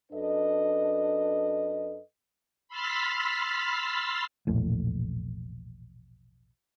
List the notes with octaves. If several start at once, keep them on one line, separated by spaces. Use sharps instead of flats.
F#2 D4 A4 B4 D#5
B5 C6 E6 F6 A6 B6
E1 A#1 A2